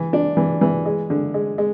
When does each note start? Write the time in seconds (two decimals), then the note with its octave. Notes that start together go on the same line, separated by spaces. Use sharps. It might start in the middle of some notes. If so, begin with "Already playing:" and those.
Already playing: E3
0.13 D4
0.37 E3
0.61 E3
0.86 G#3
1.10 D3
1.34 G#3
1.58 G#3